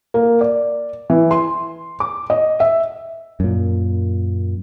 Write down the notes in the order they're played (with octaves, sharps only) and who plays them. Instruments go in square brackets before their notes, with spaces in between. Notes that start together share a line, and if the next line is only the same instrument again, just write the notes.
[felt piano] A#3
D5
E3
C6
D6
D#5
E5
[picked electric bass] F#2 A#2